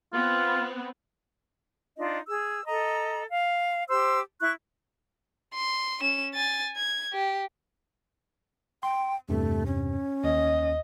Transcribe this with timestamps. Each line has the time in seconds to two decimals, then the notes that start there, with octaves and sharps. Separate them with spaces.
0.13 B3 C4 F4
1.97 D4 D#4 F4 D#5
2.29 G#4 E6
2.67 A4 D#5 A#5
3.30 F5
3.89 G4 C5 E6
4.40 E4 C#6 F#6
5.54 C6
6.01 C#4 E7
6.34 G#5 A6
6.76 G#6
7.13 G4
8.83 G5 C6
9.29 E2 G2 C3 A3
9.66 C#4
10.24 D#2 D#5